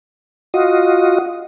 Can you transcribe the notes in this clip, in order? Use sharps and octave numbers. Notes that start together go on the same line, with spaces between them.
F4 F#4 D#5